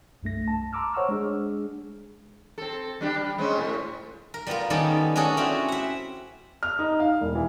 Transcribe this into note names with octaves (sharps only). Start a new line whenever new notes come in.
C2 G2 A3 A#6
A5
A#5 C6 D6 E6 F6
C5 C#5 F#5 C#6 E6 F6
G#3 D4 G#4
C4 A4
G3 D4 G4
G3
G#3 C4 C#4
A2
A#4
G3 B3 F4 A#4
D#3 G3 B3 C#4 A4 D5
C#4 D4 F#4 G#4 A4
C4 C#4 E4 F#4 G4
E5 F#5
F6
D#4
F5
E1
E3